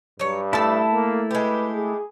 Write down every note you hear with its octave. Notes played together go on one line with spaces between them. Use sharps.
G2 F#3 C#5
A3 E4 A4 A5
A#3
G#3 G4 B4
G#4